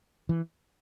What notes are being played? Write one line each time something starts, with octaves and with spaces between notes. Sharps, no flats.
E3